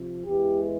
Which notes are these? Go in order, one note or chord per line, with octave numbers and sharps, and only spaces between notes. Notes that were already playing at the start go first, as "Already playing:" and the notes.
Already playing: C3 F3
E2 E3 G#3 G4